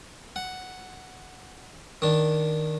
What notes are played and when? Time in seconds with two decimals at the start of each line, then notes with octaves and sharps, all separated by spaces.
0.36 F#5
2.02 D#3 D4